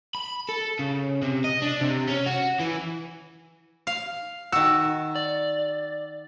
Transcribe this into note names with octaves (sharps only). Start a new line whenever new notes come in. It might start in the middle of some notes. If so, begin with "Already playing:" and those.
B5
A4
C#3
C3
D#5
D4
C3
C#4
F#4
E3
F5
D#3 F#4 E6
D5